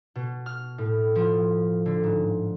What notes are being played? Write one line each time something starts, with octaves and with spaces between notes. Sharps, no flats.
B2
F6
A2
F3
D3
G#2